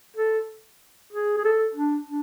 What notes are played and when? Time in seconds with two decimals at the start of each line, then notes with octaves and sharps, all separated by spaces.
0.16 A4
1.12 G#4
1.37 G#4
1.44 A4
1.75 D4
2.07 D4